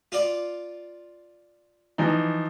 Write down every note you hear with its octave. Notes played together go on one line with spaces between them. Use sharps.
F4 D5
E3 F3 D#4